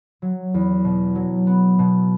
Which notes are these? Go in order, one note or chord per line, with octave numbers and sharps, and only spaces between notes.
F#3
E2
B2
F#3
B3
B2